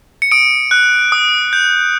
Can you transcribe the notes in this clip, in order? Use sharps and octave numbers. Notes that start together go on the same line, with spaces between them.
C#7
D#6 D7
F#6
D#6
G6